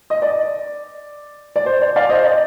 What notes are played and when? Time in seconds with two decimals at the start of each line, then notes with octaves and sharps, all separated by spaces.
0.10 D#5
0.22 D5
1.56 D5
1.66 C5
1.82 D5
1.96 D5 F5
2.09 C5 D#5
2.24 D5